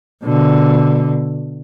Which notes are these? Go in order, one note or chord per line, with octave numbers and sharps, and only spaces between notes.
B2 D3